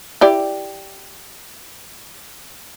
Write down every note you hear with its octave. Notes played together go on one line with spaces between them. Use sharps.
E4 G4 D5